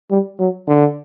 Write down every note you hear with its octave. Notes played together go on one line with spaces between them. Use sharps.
G3
F#3
D3